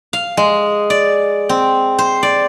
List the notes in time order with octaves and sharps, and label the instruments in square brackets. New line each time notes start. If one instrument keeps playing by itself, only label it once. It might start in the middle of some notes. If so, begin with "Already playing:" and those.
[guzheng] F5
G#3
D5
C4
C5
D5